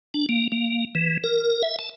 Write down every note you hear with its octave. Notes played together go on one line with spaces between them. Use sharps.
D4
A#3
A#3
E3
A#4
E5
A5